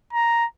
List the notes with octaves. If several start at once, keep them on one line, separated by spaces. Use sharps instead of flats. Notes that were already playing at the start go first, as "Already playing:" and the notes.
A#5